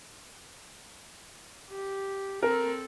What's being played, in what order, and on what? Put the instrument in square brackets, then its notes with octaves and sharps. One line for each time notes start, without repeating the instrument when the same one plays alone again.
[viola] G4
[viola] C4 A4 [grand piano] A#4